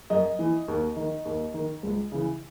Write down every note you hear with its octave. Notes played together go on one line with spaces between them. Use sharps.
F#2 D#5
E3
D#2
D#3
D#2
D#3
C#2
C#3 E3